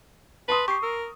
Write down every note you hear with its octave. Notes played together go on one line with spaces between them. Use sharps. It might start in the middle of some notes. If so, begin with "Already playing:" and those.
B4 A5 C6 D#6
G4 C#6 C7
A#4 E6